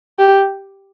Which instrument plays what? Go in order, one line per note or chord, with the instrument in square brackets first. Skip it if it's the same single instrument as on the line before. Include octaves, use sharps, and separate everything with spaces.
[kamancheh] G4